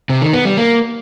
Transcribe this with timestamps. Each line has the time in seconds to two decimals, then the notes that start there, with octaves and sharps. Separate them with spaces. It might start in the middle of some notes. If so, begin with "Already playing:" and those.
0.09 C3
0.21 D#3
0.33 B3
0.45 G3
0.57 A#3